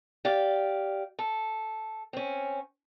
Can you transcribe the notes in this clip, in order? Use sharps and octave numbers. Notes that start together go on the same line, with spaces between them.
G4 D5 F5
A4
C4 C#4